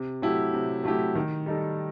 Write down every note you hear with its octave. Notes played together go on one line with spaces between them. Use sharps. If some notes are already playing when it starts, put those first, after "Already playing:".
Already playing: C3
F#3 A3 E4 G4
C3
F#3 A3 E4 G4
D#3
G3 D#4 A4